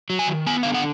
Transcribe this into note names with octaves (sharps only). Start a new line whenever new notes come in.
F#3
G#5
D#3
B3 G#5
D3 F5
F#5